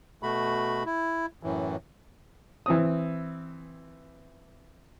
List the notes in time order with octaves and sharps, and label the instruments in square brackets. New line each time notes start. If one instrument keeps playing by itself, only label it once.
[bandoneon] B2 A3 F#4 B5
E4
F#2 A2 E3
[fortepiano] E3 C4 D#6